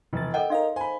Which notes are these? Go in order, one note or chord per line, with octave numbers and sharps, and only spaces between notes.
E1 C3 F3 A6
A4 A#4 D#5 F#5 G5
D#4 A#4 D#5 F5 C6
C5 G#5 B5